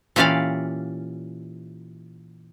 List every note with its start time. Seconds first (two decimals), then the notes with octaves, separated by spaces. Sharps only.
0.16 A#2 E3 C#4 G4 D5 F5